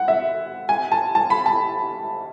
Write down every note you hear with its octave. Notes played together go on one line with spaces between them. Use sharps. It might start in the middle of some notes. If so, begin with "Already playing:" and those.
Already playing: F#5
E5
G#5
A5
A5
B5
A5